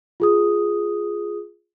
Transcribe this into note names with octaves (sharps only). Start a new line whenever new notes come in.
F4 G#4 D#6